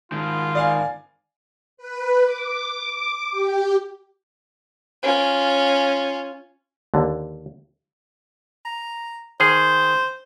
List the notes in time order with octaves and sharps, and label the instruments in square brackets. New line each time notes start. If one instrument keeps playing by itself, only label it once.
[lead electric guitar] G#2 D#3 [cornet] F4
[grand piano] D5 F5 G#5
[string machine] B4
D6
G4
[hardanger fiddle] C#4 F4
[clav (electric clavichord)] D#2 D3
[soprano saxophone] A#5
[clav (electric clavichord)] D#3 G#4 [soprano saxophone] C5